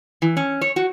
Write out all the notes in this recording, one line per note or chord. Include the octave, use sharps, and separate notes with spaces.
E3
C#4
C#5
F#4